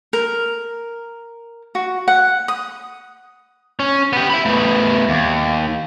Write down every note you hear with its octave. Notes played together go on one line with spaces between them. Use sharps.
A#4
F#4
F#5
D#6
C#4
B3 G4
E5 B5
A3 B3
D#2